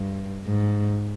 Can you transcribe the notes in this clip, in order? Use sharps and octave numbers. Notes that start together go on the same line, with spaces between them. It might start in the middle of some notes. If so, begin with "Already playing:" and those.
Already playing: G2
G#2